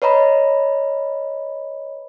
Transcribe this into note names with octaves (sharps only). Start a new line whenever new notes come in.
B4 C#5 D#5 A#5 B5